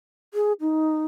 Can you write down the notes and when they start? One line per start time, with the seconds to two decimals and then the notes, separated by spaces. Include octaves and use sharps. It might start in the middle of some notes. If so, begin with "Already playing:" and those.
0.34 G#4
0.61 D#4